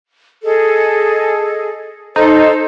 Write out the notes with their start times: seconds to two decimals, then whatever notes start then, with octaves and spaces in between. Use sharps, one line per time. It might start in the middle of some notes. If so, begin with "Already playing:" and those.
0.45 G#4 A4 D#5
2.16 D#4 A4 C5